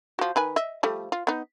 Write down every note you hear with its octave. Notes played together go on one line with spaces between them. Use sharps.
F3 F#4
D#3 B4 G#5
D#5 E5
F3 G3 A3
F4
B3 D#4